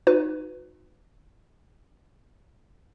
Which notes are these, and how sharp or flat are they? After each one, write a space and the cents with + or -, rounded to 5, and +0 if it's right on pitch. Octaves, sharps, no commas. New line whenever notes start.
D#4 +0 F#4 -30 B4 +25